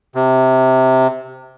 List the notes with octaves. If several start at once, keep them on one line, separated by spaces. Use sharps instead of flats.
C3